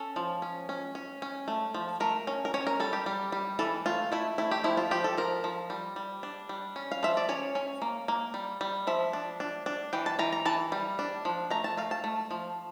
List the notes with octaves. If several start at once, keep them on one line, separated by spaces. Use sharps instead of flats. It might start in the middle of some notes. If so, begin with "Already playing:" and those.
Already playing: C#4 A4
F3
C#4
C#4
C#4
C#4
A3
F3
A3 A#4
C#4
A#4
C#4 C#5
A#4
G3 A4
G4
G3
G3
E3 A4
A3 F4
A3 E4
A3 E4
G4
F3 E4
F4
F3 G4
A4
F3 A#4
F3
G3
G3
D4
G3
C#4
F5
F3 E5
D5
C#4 C#5
C#4
A#3
A#3
G3
G3
F3 E5
D4
D4
D4
E3 G5
A5
E3 A#5
A#5
E3 A5
G3
D4
F3
A3 A#5
A5
A3 F5
A5
A3
F3